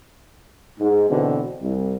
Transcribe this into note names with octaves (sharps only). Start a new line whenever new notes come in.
G#2
B2 D3 E3 C4
C2